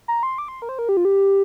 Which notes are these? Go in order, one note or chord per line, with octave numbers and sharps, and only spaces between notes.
A#5
C6
D6
C6
A#4
C5
A#4
G4
F4
G4